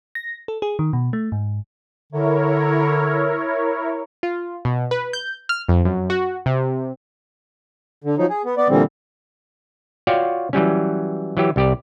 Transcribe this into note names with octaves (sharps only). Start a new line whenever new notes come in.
A#6
A4
G#4
D#3
B2
A3
G#2
D3 E4 A#4 C#5
F4
B2
B4
G6
F6
F2
F#2
F#4
C3
D3
F3 F#3 D#4
G#4
B3
B3 D5
A#2 D3 E3 G3 C4
F4 F#4 C#5 D5 F5 G5
E3 F#3 G3 C#4
E3 F#3 G4
C2 G4 D5